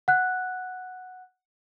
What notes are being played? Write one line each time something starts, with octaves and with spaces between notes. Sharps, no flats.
F#5 F#6